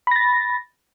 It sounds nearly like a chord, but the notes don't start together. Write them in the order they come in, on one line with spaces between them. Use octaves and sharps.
B5 A#6 A6